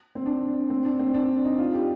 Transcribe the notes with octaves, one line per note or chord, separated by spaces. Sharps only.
C4
D4
C4
D4
C4
D4
D#4
F4
G4